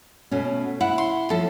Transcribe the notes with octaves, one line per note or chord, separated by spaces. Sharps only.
B2 A3 C#4
E4 F#5
C6
F3 C#4 A4 E5